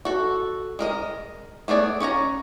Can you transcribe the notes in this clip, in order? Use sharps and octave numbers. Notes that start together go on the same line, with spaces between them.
F#4 A4
G#3 A#4 D#5
A3 B3 G#4 D5
C#4 C#5 F#5 A#5